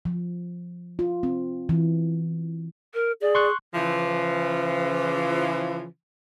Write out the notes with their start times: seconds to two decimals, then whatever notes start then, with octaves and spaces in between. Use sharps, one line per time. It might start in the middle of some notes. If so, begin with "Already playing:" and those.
0.05 F3
0.99 F4
1.23 C4
1.69 E3
2.94 A#4
3.21 G#4 D5
3.35 C6 C#6 F#6
3.74 C#3 E3 F3